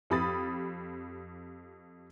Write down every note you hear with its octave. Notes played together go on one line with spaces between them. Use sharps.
F2 G4 B5 D#6 A6